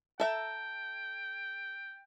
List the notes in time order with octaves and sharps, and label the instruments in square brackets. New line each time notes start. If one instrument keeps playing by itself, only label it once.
[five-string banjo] A4 E5 A#5 [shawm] G5